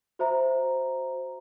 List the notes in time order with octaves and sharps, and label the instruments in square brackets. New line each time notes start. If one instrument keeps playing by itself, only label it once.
[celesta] F#4 C5 E5 A#5